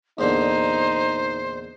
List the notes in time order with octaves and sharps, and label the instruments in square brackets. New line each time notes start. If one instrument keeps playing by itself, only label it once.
[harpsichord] E2 A#2 D3 [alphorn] D#4 [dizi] C5